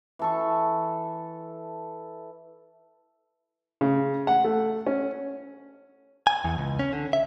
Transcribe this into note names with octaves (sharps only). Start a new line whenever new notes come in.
E3 A4 C#6
C#3
F#5
A3
C#4
G#5
E2
C#2
C#4
D3
E5